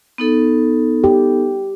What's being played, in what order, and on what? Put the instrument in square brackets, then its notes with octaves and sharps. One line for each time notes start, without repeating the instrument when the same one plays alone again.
[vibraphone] B3 D#4 A4
[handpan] G4